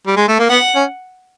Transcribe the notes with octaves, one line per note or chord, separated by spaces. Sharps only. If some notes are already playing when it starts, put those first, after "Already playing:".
G3
G#3
A3
A#3
B3 F#5
C#4